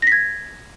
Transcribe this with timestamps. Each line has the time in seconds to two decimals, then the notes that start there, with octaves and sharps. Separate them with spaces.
0.02 A#6
0.07 B6
0.12 G#6